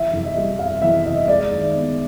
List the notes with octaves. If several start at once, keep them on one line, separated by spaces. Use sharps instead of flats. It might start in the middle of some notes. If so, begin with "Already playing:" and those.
Already playing: E3 E5
C2
D#5
G3
C3 F5
E3 E5
C2 D#5
G#3 D5
D#2
B3